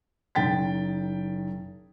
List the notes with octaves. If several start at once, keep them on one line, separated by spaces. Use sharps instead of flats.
F#1 D#3 G5 A6 B6